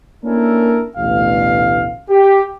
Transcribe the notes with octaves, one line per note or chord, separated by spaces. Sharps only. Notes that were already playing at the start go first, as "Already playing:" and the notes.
A#3 C#4 D4 E4 A4 A#4
A1 D2 B2 F5
G4